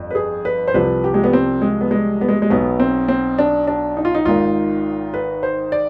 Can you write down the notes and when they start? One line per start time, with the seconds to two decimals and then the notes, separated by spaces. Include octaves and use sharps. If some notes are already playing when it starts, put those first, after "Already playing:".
Already playing: G1 F2
0.11 B4
0.15 G#4
0.45 B4
0.68 C5
0.74 C2 C3 F3 B4
1.04 G4
1.14 G#3
1.24 B3
1.33 C4
1.62 G#3
1.81 B3
1.91 G#3
2.21 B3
2.29 G#3
2.42 G#3
2.50 B1 B2 B3
2.80 C4
3.08 C4
3.38 D4
3.67 D4
3.97 D#4
4.05 F4
4.15 D#4
4.25 G#1 G#2 D#3 F4
5.14 B4
5.43 C5
5.72 D5